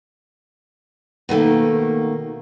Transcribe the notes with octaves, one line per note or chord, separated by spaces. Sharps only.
B2 D#3 A3 A#3